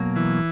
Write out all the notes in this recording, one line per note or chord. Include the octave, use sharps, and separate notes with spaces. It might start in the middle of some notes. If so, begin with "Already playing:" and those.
Already playing: B2 F#3 A#3
E3